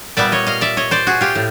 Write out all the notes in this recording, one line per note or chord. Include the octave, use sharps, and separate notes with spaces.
A#2 G3 B3 D5 E5
C#5 D#5
D#5 F5
D5 E5
C#5 D#5
C5 D5
F#4 G#4
F4 G4
A2